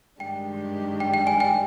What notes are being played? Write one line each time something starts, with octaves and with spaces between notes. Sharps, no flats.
G2 D#3 G#3 D4 G4 G5
G5
G5
G#5
G5